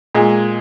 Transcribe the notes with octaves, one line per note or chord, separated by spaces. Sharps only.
A#2 G#3